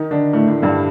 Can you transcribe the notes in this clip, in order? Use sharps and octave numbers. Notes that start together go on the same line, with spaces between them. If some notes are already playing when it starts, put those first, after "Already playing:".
Already playing: D#3 D#4
D3 D4
A2 A3
A2 A3
G2 G3